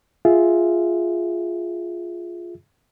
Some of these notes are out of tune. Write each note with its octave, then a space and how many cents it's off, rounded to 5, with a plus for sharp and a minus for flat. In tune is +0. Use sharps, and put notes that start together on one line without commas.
F4 +0 G#4 +0 E5 +0